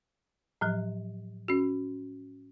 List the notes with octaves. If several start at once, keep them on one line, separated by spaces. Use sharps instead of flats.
A2 F3 F#3
C#4 F#4